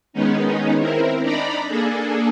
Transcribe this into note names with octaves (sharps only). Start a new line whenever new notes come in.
D#3 G#3 B3 C#4 D#4
C4 E4 A#4
D4 D#4 D5 A#5 B5
A#3 D4 G#4 A4